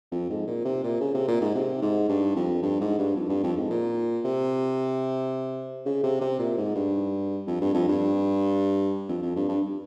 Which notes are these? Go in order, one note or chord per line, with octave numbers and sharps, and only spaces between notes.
F2
G#2
A#2
C3
A#2
C#3
C3
A#2
G#2
C3
G#2
G2
F2
G2
G#2
G2
F2
G2
F2
G#2
A#2
C3
C#3
C3
C3
A#2
G#2
G2
F2
G2
F2
G2
F2
F2
G2
G2